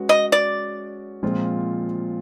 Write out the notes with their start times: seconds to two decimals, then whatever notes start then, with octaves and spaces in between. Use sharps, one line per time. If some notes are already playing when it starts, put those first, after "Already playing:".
Already playing: G#3 C#4 F#4 B4
0.09 D#5
0.32 D5
1.23 A#2 F3 G#3 C4 F4